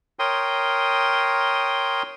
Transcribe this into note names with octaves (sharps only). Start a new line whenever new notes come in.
A#4 C#5 G5 C6 D#6